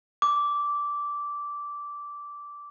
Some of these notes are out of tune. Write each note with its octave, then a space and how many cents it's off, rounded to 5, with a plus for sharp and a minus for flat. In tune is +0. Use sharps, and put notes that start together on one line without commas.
D6 -10